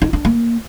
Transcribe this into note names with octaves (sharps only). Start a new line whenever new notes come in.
D#4
D4
A#3